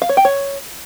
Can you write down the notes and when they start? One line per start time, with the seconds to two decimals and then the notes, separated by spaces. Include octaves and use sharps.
0.02 F5
0.09 C#5
0.17 G5
0.25 C#5